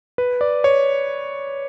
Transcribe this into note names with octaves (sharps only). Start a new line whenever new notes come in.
B4
D5
C#5